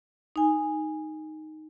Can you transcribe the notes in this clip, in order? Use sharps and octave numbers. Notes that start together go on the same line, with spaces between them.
D#4 G#5